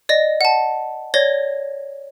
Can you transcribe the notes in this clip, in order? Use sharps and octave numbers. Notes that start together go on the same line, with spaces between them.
D5 D#5 A#6
F#5 A5
C#5 D5 G#6 A#6 G7